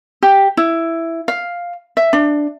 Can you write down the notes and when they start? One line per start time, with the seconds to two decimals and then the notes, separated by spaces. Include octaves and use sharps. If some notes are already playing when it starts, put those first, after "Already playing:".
0.22 G4
0.57 E4
1.28 F5
1.97 E5
2.13 D4